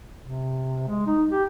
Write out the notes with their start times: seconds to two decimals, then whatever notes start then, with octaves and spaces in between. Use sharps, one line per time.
0.21 C3
0.88 G#3
1.07 D#4
1.31 G4